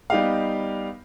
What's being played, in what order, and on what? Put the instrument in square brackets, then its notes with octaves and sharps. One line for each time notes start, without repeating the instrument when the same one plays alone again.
[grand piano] G3 B3 D#4 G4 D#5 F5